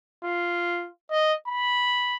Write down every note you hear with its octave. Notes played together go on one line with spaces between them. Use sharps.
F4
D#5
B5